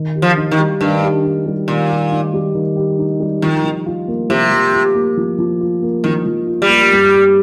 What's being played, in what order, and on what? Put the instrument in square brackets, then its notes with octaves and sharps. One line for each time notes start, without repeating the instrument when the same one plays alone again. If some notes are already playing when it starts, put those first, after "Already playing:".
Already playing: [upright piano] D#3
G4
[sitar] F3
[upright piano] D#4
[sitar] D#3
[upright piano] G3
[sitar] G2 [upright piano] D#3
[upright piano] G4
D#4
G3
[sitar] A#2 [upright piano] D#3
[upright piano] G4
D#4
G3
D#3
G4
D#4
G3
[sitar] D#3 [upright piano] F3
[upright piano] F3
F4
A#3
[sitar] C3 [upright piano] F3
[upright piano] F3
F4
A#3
F3
F3
F4
A#3
[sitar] D#3 [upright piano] F3
[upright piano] F3
F4
[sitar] G3
[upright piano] A#3
G2
G4